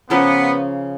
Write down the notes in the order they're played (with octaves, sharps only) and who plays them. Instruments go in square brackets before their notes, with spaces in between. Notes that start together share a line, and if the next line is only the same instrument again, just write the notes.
[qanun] C#3 F3 A#3 C#4 [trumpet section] B3